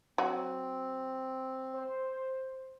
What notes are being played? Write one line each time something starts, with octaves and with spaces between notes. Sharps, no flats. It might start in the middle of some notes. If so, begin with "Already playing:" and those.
F#3 C4 F#4
C5